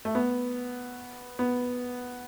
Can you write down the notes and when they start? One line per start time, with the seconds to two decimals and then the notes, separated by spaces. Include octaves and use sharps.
0.05 A3
0.15 B3
1.39 B3